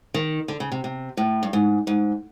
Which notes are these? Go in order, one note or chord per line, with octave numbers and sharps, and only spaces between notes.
D#3
D3
C#3
C3
C3
A2
G2
G#2
G#2